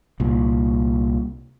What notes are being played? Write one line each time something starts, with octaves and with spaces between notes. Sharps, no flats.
C2 A#2